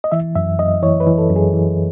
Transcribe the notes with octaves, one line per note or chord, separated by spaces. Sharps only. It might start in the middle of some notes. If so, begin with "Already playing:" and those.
D#5
E3 E5
F#2 E5
F#2 D#5
E3 C#5
B4
E3
A4
F#2
G#4
E3